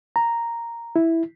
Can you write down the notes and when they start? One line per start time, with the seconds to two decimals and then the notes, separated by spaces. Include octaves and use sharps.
0.16 A#5
0.96 E4